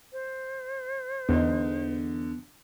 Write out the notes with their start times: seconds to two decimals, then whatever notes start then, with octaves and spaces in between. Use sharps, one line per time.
0.13 C5
1.29 E2 D3 B3 D#4